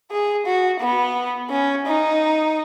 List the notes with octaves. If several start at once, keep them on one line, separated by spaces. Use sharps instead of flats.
G#4
F#4
B3
C#4
D#4